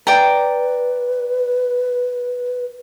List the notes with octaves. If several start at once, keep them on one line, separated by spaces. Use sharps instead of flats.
B4 D5 G5 A#5